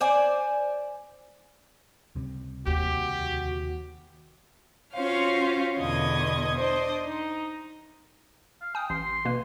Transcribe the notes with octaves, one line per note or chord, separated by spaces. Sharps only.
C5 D5 G#5
C#2 C3 G3
D#2 F#4 G4
C#4 F4 F#4 C5 C#5 F5
E2 B2 D3 D#5 G#6
D4 C5 D#5
D#4
F5
G5 G#5 D#6
A1 C6
B2 A#3 B4